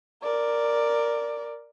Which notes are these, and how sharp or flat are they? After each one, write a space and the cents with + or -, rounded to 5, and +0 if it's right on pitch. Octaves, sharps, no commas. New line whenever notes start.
A#4 +0 D5 +0